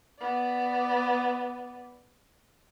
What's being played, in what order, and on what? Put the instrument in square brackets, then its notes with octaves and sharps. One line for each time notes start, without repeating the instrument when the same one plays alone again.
[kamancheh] B3 D5